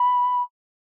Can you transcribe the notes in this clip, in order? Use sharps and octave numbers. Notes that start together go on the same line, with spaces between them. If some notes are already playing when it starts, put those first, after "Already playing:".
Already playing: B5